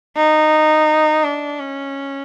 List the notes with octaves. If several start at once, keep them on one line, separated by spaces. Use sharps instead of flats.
D#4
D4
C#4